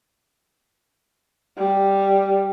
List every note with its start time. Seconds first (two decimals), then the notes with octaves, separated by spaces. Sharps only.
1.58 G3